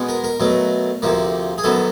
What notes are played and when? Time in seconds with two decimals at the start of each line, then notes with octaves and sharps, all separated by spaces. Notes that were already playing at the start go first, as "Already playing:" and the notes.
Already playing: B2 G#3 B3
0.09 A#4
0.24 A#4
0.40 B2 F#3 A3
1.02 D2 C3 F3 A#3
1.58 G#4
1.64 F#2 D#3 F#3 B3 A4